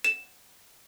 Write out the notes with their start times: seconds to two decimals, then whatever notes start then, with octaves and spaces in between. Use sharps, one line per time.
0.04 E7